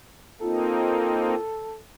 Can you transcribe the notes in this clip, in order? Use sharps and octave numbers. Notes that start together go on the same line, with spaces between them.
A#3 C4 D#4 F4 A4